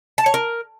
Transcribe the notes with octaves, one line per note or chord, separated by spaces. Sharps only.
A5
C#5
A#4